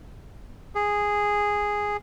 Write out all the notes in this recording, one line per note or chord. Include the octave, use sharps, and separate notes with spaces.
G#4